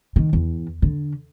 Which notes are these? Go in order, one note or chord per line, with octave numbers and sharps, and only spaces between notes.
D#3
E2
D3